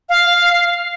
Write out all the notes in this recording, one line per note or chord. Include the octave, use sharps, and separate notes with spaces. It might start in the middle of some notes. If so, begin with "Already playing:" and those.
F5